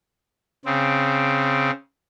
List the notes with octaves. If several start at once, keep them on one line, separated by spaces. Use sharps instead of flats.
C#3 C4